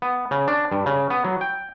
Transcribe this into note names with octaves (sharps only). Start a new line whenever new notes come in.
B3
C#3
D4
G2
C#3
B3
F#3
G5